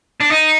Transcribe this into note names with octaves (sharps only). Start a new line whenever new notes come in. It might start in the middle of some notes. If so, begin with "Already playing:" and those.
D4
D#4